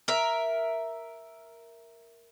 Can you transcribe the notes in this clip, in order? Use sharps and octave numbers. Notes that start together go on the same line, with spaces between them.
A#4 E5